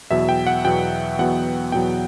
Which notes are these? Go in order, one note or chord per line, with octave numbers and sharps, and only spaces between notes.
E2 B2 F#3 B3 E5
G5
F#5
E2 B2 F#3 B3 G5
E2 B2 F#3 B3 F#5
E2 B2 F#3 B3 G5